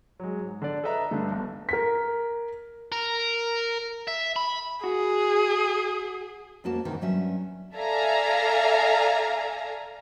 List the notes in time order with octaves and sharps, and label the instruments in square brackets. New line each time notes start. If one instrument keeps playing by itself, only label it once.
[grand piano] F#3 G#3
G#2
D3 D5
A4 B4 D#5 E5 A#5
G2 D3 A3
G1
[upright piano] A#4 B6
[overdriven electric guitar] A#4
E5
B5
[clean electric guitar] F#4 [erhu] G#4
[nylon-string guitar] F2 G#3 A#3 C#4 F#4 A5
E2 G#2 C3 D#3 E3
G2 F#3 C#4 E5
[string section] A4 D5 E5 F5 G#5 A#5